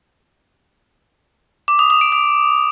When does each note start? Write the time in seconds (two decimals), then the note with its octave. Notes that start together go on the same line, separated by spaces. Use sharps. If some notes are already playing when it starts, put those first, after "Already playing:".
1.68 D6
1.79 D#6
1.90 D#6
2.01 D7
2.12 D#6